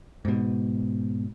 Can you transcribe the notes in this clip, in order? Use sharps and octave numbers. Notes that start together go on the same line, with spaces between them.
G#2 B2